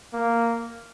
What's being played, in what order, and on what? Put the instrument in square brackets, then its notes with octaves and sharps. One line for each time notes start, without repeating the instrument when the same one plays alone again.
[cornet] A#3